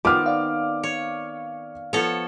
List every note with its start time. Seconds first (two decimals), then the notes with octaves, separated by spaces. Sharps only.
0.05 D#3 B3 C4 F4 D6 F6
0.26 D5 F5
0.83 C#5
1.93 F3 B3 A4 C#5